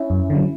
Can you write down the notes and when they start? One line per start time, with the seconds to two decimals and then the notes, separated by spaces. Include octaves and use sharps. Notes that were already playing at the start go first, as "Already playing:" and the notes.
Already playing: C#4 E4
0.10 F#2
0.30 D3
0.35 F#3